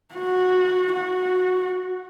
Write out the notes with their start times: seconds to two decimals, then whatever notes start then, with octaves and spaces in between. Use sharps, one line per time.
0.15 F#4
0.93 F#4